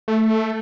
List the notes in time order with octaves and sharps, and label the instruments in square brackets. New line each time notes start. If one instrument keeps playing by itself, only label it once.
[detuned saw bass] A3